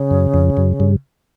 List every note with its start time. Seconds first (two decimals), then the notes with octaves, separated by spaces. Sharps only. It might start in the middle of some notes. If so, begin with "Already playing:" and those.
Already playing: C#3
0.11 F#2
0.34 F2
0.57 F#2
0.80 G2